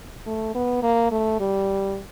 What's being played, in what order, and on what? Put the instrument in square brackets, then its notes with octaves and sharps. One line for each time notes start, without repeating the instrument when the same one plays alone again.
[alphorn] A3
B3
A#3
A3
G3